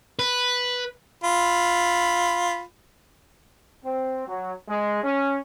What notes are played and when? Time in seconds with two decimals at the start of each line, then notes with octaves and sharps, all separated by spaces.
0.19 B4
1.24 F4 B5
3.85 C4
4.28 F#3
4.69 G#3
5.04 C#4